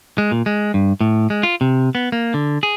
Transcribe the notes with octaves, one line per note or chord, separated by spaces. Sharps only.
G#3
A#2
G#3
G2
A2
G#3
F4
C3
B3
A#3
D3
G#4